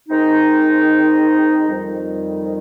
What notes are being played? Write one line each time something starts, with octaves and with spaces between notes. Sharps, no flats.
D#3 G#3 C4 D#4
F2 D#3 G3